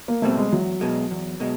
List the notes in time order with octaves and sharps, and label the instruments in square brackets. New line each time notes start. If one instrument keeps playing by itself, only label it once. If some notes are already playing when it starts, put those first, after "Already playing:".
[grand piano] A#3
[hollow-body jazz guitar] B2 G3 C4 [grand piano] A3
[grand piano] G#3
[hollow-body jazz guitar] E2 [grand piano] F#3
[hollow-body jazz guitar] B2 G#3
E2
B2 G#3